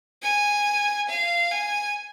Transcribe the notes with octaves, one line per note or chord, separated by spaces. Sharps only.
G#5
F5
G#5